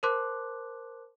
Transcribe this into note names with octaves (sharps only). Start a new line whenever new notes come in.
A#4 C5 A5 C6 D6 F#6